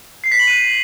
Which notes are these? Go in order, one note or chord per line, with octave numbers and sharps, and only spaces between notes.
C7
B6
F#7
D#7